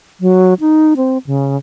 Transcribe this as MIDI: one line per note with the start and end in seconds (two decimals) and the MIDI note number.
0.21 0.54 54
0.60 0.93 63
0.97 1.18 60
1.27 1.57 49